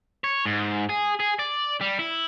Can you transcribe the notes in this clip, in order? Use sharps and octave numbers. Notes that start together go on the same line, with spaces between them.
C#5
G#2
G#4
G#4
D5
G3
E4